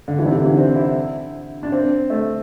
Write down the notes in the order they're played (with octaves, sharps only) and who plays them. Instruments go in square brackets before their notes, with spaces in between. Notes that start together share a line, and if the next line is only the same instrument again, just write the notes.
[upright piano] D3
E3
C3
D3
E3
C4
E4
D4
C4
A3